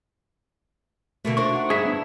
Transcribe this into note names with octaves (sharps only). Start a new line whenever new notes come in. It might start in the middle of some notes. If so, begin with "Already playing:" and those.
B2 D3 A3 A#3
D4 F#4 C5 C#6
D#4 F#5
G2 G#4 E5
B3 D4 E4 E5